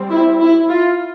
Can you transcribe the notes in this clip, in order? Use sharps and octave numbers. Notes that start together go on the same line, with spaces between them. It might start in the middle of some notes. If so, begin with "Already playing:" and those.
Already playing: G3 C4
E4
E4
F4